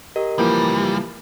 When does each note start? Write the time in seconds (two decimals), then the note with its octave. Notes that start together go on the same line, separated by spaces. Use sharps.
0.16 G4 A#4 D#5
0.39 C#2 E3 F3 G3 A#3